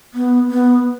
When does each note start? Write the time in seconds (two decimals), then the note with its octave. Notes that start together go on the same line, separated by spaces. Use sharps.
0.14 B3
0.51 B3